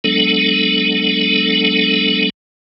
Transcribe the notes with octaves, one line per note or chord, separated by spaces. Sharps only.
F#3 G#3 B3 D4 A4